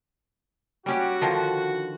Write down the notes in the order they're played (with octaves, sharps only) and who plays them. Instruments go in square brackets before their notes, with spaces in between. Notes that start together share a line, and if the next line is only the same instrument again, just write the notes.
[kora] G3 C#4 G4 [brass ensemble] F#4
[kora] D3 D#3 F3